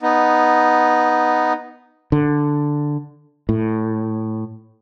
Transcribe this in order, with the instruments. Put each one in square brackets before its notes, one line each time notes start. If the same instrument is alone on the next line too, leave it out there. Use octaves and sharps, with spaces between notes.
[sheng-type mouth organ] B3 D#4
[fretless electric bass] D3
A2